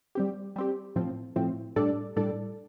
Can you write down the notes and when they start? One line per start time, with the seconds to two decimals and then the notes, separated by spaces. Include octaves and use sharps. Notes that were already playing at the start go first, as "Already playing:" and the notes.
0.15 G3 C4 G4
0.56 G3 C4 G4
0.96 A2 F3 C4
1.36 A2 F3 C4
1.76 A2 G3 D4 A4 D5
2.16 A2 G3 D4 A4 D5